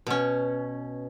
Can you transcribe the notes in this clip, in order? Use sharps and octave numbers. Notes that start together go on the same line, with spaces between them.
B2 C#4